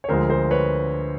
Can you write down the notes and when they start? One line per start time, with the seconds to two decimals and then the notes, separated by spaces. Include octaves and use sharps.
0.04 C#5
0.09 D2 D3 F3 G#3 A#4 C5
0.29 A#4 C5
0.51 B4 C#5